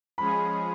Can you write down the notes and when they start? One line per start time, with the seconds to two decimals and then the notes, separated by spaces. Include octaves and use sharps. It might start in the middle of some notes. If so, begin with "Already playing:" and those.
0.18 F3 G#3 C#4 G#4 B5